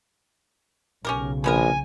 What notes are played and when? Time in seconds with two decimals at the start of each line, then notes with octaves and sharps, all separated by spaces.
1.05 B1 C#3 C#4 G4 A#4
1.44 A#1 F3 B3 A#4 G#5